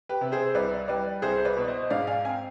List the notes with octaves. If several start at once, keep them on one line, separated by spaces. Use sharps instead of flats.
G4 B4
C3
G#4 C5
C2 B4 D5
G3 B4 D5
C2 G#4 C5
B4 D5
B2
C5 D#5
G#2 D5 F5
F5 G#5
C4 F5 G#5